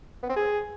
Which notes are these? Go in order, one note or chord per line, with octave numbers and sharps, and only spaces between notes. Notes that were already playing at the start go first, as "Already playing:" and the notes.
B3
C4
G#4